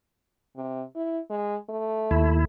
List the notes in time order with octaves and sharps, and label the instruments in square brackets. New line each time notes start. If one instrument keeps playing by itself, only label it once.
[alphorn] C3
E4
G#3
A3
[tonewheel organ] D#2 E4